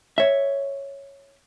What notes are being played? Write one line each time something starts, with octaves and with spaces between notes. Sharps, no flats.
C#5 E5